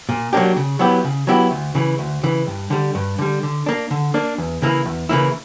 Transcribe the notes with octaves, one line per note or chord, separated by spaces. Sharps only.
A#2
F#3 A#3 D4 G4
C#3
F#3 B3 E4 G4
C#3
F#3 B3 E4 G4
D2
C#3 E3
D2
C#3 E3
G2
D3 G3
G2
D3 G3
D3
A#3 D4
D3
A#3 D4
E2
C#3 E3 A#3 E4
E2
C#3 E3 A#3 E4